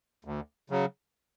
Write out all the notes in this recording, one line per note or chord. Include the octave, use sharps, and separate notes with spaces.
D2
C#3 F#3